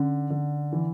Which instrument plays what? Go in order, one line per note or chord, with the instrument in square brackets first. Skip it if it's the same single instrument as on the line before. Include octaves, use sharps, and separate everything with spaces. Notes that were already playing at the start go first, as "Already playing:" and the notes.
Already playing: [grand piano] D3 [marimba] C#4
[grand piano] D3
E3